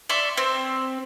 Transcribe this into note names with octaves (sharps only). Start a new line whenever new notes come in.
D5 E5 C6 C#6
C4